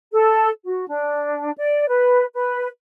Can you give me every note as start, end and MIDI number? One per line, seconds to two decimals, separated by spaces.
0.12 0.50 69
0.66 0.87 66
0.89 1.51 62
1.57 1.88 74
1.88 2.25 71
2.34 2.67 71